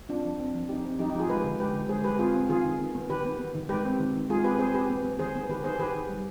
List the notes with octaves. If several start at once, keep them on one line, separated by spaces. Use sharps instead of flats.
C4 D4 F4
F3
C4
F3
C4 D#4 G4
C4
F3 D#4 G4
D#4 G4
F3 F4 G#4
G#3 G4 B4
D3
G#3 G4 B4
D3
G#3 G#4 C5
G#3 G4 B4
C4 F4 G#4
C4
D#3 F4 G#4
D#3
B3
B3
D#3 G4 B4
B3
B3
D#3
G#3 G4 B4
C4
D#3
D#3
G#3 F4 G#4
C4 G4 B4
C4 G#4 C5
C4 G4 B4
B3
B3
D#3 G#4 C5
B3
D#3 G4 B4
B3 G#4 C5
G#4
D#3 G4 B4
D#3
G3